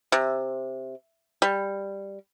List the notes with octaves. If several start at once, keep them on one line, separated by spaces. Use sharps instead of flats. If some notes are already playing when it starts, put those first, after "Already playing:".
C3
G3